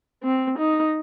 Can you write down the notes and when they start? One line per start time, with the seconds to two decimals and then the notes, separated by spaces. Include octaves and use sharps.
0.23 C4
0.59 D#4